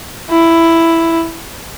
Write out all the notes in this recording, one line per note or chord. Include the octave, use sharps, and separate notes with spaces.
E4